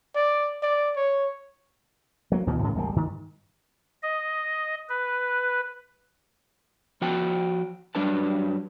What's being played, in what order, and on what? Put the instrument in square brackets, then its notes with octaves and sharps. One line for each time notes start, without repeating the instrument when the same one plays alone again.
[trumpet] D5
D5
C#5
[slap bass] F#3 A#3
D2 B2 E3
G#2 C#3 E3 A#3
D1 G#1 G3 A#3
G2 D#3
[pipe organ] D#5
B4
[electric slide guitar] F3 F#4 G5 A5
G2 F#3 G3 D4 B4 A5